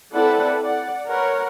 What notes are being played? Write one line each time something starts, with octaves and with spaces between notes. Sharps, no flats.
C4 E4 A4 B4 D5 F#5
D5 F#5
A#4 B4 C#5 F#5